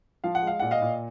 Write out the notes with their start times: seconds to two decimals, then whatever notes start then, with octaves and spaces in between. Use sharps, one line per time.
0.24 F3 F5
0.35 F#5
0.42 G#3
0.47 F5
0.60 A#2 F#5
0.71 D#5 F5
0.82 A#2